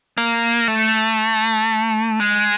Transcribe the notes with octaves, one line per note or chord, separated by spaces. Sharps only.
A#3
A3
G#3